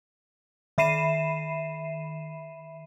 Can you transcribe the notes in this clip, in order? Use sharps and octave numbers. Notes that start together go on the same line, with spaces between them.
D#3 E5 B5 C7 D#7 E7